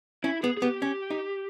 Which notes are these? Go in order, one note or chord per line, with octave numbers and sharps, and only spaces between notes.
C#4 E4
B3 G#4
G#4
B3 G4
C#4
D#4